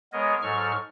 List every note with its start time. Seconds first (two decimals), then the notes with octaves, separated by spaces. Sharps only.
0.13 G#3 B3 A#4 C#5 D#5
0.42 G#2 F#3 A4 C#6 F6